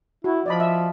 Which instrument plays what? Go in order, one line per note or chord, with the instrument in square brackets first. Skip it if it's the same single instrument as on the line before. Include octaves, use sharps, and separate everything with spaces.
[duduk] E4 [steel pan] F#4
[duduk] F3 [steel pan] D5 D#5 B5
[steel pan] E5